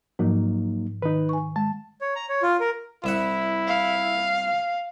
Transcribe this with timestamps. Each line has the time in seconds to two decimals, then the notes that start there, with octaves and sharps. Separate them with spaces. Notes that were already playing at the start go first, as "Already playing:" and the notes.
0.19 G#2 F3 F#3 A#3 D#4
1.02 D#3 D#4 B4
1.29 G#5 C#6
1.56 G#3 A5
2.01 C#5
2.16 A#5
2.29 C#5
2.42 F4
2.60 A#4
3.04 C2 E4 E5 F#5
3.67 F5